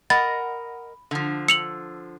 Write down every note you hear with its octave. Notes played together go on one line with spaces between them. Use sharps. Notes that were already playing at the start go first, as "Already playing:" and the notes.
A#4 D#5 F#5 B5 A6
D3 F3
E6 C#7 F7 F#7